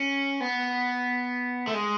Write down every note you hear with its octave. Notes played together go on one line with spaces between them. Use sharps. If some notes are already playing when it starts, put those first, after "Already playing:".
Already playing: C#4
B3
A3
G#3